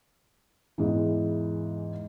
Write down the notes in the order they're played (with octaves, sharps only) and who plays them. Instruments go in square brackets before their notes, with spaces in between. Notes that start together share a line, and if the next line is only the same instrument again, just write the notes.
[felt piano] E2 G#2 E3